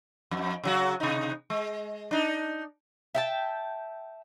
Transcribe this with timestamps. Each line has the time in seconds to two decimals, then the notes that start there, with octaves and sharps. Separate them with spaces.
0.31 F2
0.64 C#3 F#3 F#4
1.00 C3 D#4
1.50 G#3
2.11 D4 D#4
3.15 E5 G5 A5